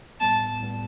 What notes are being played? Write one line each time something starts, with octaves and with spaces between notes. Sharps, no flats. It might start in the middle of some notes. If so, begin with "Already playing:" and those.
A2 G3 B3 A5
A2 G3 B3